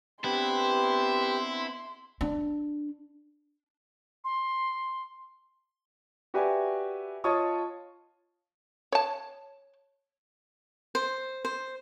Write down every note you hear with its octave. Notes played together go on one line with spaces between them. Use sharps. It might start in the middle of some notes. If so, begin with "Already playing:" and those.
B3 C4 D4 E4 G4 B4 C6
D4
C6
F#4 G4 B4 D5 E5 G#5
F4 C#5 D#5 A5 C#6 D#6
C#5 A5
C5
C5